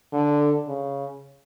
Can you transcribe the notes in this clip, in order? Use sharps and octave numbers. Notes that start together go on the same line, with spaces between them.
D3
C#3